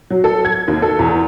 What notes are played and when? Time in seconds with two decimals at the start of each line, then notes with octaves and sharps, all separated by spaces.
0.10 F#3
0.24 A4
0.45 G#6
0.68 D#2
0.82 A4
0.99 E2